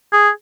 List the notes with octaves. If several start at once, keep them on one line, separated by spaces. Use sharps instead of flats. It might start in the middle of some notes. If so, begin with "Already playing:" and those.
G#4